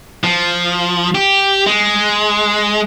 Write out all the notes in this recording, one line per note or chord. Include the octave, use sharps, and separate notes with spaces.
F3
G4
G#3